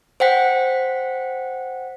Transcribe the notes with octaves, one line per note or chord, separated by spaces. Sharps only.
C5 F#5 G5 B6